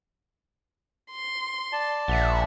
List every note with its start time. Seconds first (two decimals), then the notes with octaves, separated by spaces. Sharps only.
1.11 C6
1.72 D5 A5
2.08 A#1 E5 F#5